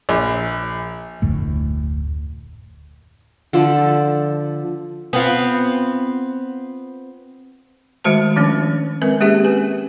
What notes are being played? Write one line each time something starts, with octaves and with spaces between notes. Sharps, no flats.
A#1
F1 D2 A2
D3 F3 A4 B5
B3 C4 F4
D#3 G#3 A3 F#4 C5 A5
D#3 F3 A3 C#4 D4
G#3 C4 A#4 B4
G#3 A#3 C#4 G4 G#4 E5
B4 G#5